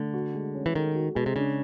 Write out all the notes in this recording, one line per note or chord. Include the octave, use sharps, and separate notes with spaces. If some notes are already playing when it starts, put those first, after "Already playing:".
Already playing: D3 A3
F#4
G#3
C#4
E3
D#3 A4
F#4
B2 G#3
C3
C#3 D4